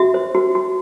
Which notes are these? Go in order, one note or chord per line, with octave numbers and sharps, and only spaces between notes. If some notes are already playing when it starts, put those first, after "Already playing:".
Already playing: F#4 E5
C5
F#4
F#4